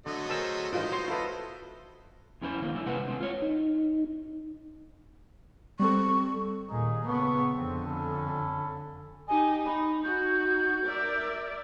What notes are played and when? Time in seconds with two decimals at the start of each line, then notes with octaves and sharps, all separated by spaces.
0.06 D3 F#3 A3 D#5
0.29 G#4 A#4 C5 A5 E6
0.73 A1 G2 E3 F#3 F4 C5 D#5
0.92 F#4 C#5 D#5 C6
1.08 E4 F4 A4 B4 D#5
2.41 F2 C#4 E4 C5
2.61 D3 D#3 A#3 C5
2.74 G3 D#4 E4
2.86 C3 G#3 B4 C5 F#5
3.07 G#3 C4 D#4
3.20 F4 C#5
3.42 D#4
5.80 G3 C4 A4 C#6
6.70 D#2 A#2 D#4 G#4
7.07 C#3 B3 A4 C#6
7.55 F2 D3 C4
7.85 C#4 A4 B5
9.28 D#4 G4 D#5 G#5
9.65 D#4 B5
10.03 D#4 F#4 G6
10.85 A#4 D5 E5